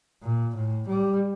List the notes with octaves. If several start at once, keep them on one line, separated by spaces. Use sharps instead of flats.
A#2
A2
G3